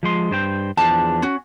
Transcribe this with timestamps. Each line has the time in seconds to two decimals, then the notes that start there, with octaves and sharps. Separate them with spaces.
0.03 F3 G#3 C6
0.31 G2 C5 G5
0.77 E2 F3 D4 G#4 A5
1.22 C#4 F#4